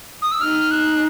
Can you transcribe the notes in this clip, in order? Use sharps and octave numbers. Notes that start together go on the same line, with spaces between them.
D#6
E6
D#4 F6
F#6